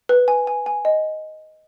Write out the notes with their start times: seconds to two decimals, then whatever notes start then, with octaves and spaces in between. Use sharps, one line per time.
0.09 B4
0.28 G#5
0.47 G#5
0.66 G#5
0.85 D#5